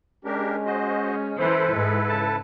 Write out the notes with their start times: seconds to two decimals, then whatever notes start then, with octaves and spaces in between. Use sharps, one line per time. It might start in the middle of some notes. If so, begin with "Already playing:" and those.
0.25 G#3 C#4 D4 G4 A#4
0.66 F#4 C5 D#5
1.39 E3 E4 A4 B4 C5
1.74 G#2 G#3
2.10 C#3 A5